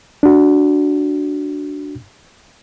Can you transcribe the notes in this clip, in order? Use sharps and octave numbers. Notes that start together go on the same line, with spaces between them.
D4 F#4